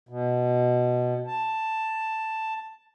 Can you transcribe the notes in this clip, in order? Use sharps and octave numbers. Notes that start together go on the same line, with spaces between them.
B2
A5